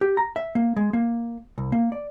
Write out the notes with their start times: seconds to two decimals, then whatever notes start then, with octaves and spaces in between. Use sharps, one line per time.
0.01 G4
0.17 A#5
0.36 E5
0.55 A#3
0.76 G#3
0.93 A#3
1.58 C2
1.72 A#3
1.92 D5